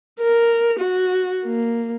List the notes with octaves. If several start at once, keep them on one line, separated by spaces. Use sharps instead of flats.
A#4
F#4
A#3